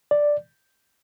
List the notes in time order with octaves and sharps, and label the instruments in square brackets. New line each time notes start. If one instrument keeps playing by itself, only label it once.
[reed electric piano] D5